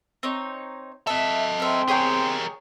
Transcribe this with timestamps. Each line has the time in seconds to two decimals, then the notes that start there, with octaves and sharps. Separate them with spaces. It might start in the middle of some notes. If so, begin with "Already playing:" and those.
0.23 C4 D#4 C#5
1.07 A4 D#5 E5
1.60 C4 A#4 E5
1.88 G4 G#4 A#4 C#5 G5